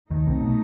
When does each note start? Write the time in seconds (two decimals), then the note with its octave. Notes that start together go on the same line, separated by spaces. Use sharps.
0.10 D#2 D#3 F#3 A3 D#4
0.26 C2 C3
0.41 B2